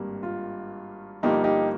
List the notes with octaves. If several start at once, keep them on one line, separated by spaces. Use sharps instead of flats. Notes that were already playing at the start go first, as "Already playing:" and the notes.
Already playing: G#1 G2 G3 A#3
F4
G1 G2 F3 A#3 D#4 G4
D#4 G4